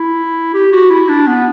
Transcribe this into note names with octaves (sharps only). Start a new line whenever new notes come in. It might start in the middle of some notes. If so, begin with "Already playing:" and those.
Already playing: E4
G4
F#4
E4
D4
B3